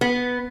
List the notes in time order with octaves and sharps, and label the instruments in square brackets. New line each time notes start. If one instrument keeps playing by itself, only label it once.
[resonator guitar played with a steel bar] B3